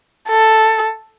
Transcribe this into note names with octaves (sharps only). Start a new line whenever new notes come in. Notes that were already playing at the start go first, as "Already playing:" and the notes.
A4